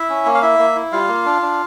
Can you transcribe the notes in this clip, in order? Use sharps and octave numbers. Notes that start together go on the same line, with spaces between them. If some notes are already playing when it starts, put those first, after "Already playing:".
Already playing: E4 E5
C#4
A#3
F5
E4 E5
A#3
E4
G3 F4 F5
A#3
D4
D4